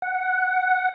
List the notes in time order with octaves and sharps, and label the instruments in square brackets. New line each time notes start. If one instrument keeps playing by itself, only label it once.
[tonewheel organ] F#5